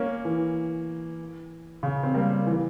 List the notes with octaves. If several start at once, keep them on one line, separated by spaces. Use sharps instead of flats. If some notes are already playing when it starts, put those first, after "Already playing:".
Already playing: A#3 C#4
E3
C#3
C4
G3 A#3
E3